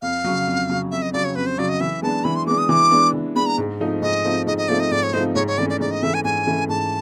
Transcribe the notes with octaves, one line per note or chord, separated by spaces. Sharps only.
F2 F5
C#3 F#3
F2
C#3 F#3
F2 E5
D#5
C#3 F#3 D5
C#5
F2 B4
C5
C#3 F#3 D5
D#5
E3 E5
G#3 B3 D4 A5
E3 B5
C6
G#3 B3 D4 D6
D#6
E3 D6
G#3 B3 D4
E3
G#3 B3 D4 B5
A#5
G#2
F3 A3 C4 D#4
G#2 D#5
F3 A3 C4 D#4
G#2 D#5
D#5
F3 A3 C4 D#4 D5
D#5
G#2 D5
C#5
F3 A3 C4 D#4 C5
G#2 C#5
C#5
E3 A3 C#4 D5
D5
G#2 D5
D#5
E3 A3 C#4 E5
G#5
G#2 G#5
E3 A3 C#4
G#2 A5